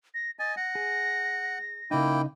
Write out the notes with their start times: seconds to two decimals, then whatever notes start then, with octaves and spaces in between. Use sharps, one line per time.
0.14 A#6
0.39 D#5 G#5 A6
0.57 F#5 A#6
0.75 G#4
1.91 C#3 A#3 D#4 E4 G5